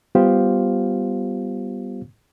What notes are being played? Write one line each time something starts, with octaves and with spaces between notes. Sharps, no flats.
G3 B3 F4 G4 C5 F5